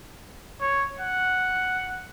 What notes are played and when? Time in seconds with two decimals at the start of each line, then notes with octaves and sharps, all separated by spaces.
0.61 C#5
1.00 F#5